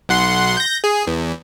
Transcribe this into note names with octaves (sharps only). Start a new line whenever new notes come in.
B1 F#5 C6
G6 A#6
G#4
E2